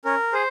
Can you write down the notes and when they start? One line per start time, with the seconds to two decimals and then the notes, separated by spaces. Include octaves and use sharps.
0.05 C#4 A#4
0.33 G#4 C5